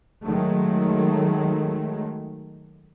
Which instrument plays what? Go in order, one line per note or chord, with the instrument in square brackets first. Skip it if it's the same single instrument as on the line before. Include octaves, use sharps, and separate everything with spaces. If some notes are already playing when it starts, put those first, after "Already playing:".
[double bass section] D#3 F#3 G#3 A3